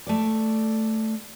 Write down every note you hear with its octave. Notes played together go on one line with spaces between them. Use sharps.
A3 D5